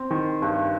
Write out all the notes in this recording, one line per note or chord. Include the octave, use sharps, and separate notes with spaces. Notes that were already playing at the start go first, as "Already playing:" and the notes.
Already playing: C4
D#3
G2